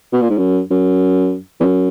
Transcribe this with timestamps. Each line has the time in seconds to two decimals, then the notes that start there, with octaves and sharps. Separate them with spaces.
0.13 B2
0.21 A#2
0.30 G#2
0.38 F#2
0.71 F#2
1.61 E2
1.64 F#2